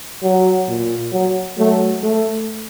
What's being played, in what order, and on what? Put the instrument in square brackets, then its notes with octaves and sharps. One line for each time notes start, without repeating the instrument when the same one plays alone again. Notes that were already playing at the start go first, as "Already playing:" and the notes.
[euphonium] F#3
[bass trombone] A#2
[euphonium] F#3
[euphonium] F#3 [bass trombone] A3
[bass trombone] A3